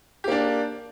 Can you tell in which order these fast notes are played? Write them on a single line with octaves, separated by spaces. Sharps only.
G4 A#3 D4